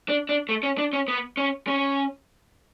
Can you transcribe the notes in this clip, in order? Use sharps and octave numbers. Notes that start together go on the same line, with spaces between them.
D4
D4
A3
C#4
D4
C#4
B3
C#4
C#4